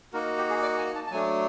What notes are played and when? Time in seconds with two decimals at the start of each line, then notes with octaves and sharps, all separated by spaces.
0.13 A#3 D#4 F#4 A#4
0.38 G4
0.50 G#4
0.62 D5
0.78 G#5
0.95 A5
1.07 A5
1.11 F#3 A3 D4 G#5